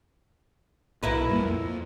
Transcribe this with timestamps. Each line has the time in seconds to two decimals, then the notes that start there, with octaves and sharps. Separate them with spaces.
1.03 B1 E4 A#4 B4
1.29 G2 A#2 A#3
1.43 F2